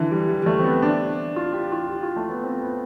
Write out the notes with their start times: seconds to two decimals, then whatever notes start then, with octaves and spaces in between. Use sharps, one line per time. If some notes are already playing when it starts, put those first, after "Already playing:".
Already playing: D3 E3
0.11 G3
0.28 G3
0.42 G3
0.46 A3
0.59 C4
0.64 B3
0.82 D4
1.36 F4
1.53 G4
1.72 F4
1.89 G4
2.03 F4
2.16 A3
2.29 B3
2.44 C4
2.61 B3